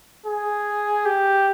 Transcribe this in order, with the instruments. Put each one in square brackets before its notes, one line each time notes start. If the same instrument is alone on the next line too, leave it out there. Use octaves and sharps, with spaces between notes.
[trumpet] G#4
G4